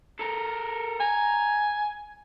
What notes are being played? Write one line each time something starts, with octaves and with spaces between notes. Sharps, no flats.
A4 A#4
G#5 A#5